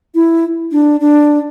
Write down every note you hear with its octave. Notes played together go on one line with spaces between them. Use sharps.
E4
D4
D4